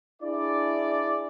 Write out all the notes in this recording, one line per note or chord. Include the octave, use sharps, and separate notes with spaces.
D4 E4 G#4 D5